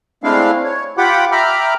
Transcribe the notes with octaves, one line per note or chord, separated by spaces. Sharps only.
G#3 A3 C4 D4 E4 F5
C#5
F4 G4 F#5 G5 B5 D6
E5 G5 A#5 B5 D6 F6